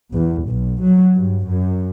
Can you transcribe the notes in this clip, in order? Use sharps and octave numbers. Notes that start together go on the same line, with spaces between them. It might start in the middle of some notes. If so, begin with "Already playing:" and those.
E2
B1
F#3
G2
F#2